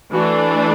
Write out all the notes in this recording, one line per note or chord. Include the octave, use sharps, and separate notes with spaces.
E3 A3 D4 F#4